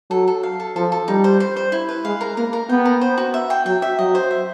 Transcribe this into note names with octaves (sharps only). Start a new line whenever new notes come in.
F#3 A4
A4
F5
A4
F3 A4
A4
G3 D#4
C5
C5
C5
E4
B4
G#3 F5
A#4
A#3 A#4
A#4
B3 G5
A#4
C5
F#4
E5
G5
F#3 G5
E5
F#3 D#5
C5
E5